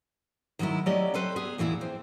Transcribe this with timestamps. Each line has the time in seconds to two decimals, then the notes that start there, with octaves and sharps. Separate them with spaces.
0.59 D#3 F#3 G#3 A3 E4
0.86 F#3 A3 C#4 G4 D5 D#5
1.14 C4 A4 B4 C5
1.36 B3 G#4
1.58 E2 A#2 E3 E4 G#4
1.81 C4